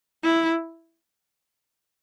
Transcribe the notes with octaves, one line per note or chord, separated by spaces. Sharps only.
E4